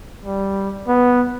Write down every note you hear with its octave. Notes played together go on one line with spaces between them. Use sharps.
G3
B3